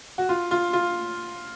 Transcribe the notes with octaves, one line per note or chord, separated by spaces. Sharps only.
F#4
F4
F4
F4